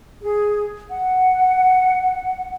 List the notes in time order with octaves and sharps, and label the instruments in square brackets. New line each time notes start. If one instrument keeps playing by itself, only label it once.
[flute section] G#4
F#5